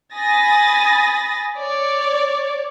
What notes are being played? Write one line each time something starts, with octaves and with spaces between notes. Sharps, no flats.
G#5 B5 D#6 A6 A#6
C#5 D5